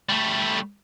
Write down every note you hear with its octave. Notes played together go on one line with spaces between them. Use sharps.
G3 A3